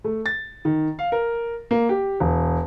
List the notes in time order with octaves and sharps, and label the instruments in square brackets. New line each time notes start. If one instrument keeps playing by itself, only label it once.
[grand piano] A3
A6
D#3
F5
A#4
A#3
G4
E1